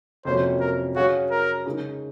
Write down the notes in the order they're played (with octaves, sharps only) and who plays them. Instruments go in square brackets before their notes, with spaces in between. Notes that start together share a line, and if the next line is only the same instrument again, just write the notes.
[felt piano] F2 C3 F#3 A#3 C#4 [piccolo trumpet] C5
[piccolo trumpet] A#4
[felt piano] F#3 C#4 G#4 C#5 F5 [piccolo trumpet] F#4
[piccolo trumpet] A#4
[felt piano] C#3 G#3 D#4 A#4